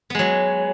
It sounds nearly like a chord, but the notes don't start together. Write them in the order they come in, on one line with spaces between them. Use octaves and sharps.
B3 G#3 F#3